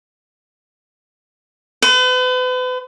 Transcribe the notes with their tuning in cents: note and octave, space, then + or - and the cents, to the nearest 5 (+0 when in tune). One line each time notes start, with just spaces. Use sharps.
B4 +40